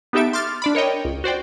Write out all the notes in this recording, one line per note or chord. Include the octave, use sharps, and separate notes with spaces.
B3 D#4 G4 A4 E5 D7
C6 D6 F6 A6
D4 D5 B5
A#4 C#5 D#5 G5
C#2
F#4 C5 D5 G5